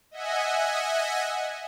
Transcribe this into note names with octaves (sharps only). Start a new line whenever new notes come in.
D#5 E5 F#5 G#5